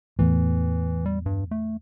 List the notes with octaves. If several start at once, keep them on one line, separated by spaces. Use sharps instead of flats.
E2 A2 E3
G3
G2
A3